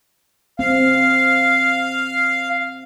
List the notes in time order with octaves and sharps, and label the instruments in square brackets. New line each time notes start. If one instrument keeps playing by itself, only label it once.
[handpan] C4 [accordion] F5